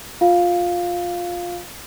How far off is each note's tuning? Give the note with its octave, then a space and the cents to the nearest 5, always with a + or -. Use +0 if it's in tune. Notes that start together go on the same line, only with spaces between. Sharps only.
F4 +15 F5 +0